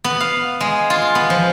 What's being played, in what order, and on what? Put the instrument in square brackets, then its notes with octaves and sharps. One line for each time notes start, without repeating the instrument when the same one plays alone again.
[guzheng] B3
F5
G#3
F4
B3
F3